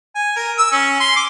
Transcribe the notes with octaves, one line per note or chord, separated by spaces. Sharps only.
G#5
A#4
E6
C#4
C6
D6